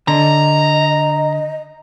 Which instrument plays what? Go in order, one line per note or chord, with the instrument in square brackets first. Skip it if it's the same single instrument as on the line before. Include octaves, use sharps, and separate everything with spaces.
[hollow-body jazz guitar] D3 [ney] D#5 [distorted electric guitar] A#5